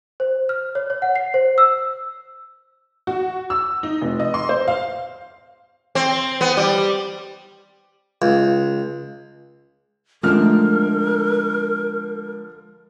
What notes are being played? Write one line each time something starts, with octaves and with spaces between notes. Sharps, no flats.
C5
F6
C#5
C#5
F#5
C7
C5
E6
F#4
E6
D#4
F1
D#5
C6
C5
F5
C4
B3
G3
C#2
D3 F3 G#3 A3 D4 A#4 F6